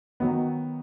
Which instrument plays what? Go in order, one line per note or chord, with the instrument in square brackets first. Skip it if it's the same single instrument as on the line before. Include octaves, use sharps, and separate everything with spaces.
[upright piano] D#3 F#3 B3 D#4